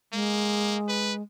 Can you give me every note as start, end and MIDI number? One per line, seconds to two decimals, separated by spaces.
0.13 1.22 56
0.13 0.76 58
0.89 1.13 71